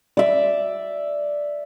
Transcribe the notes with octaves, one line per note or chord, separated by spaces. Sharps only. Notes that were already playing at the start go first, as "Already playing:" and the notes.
D5 E5